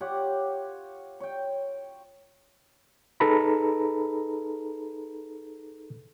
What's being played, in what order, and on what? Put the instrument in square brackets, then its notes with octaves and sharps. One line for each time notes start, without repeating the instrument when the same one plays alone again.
[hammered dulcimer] F4 G4 C#5 F#5
C#5 G5
[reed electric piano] D#4 G#4 A4 B4 A#5 B5